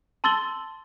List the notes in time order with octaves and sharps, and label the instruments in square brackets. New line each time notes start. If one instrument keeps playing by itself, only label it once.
[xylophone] A5 C6 E6 A6 F#7 G7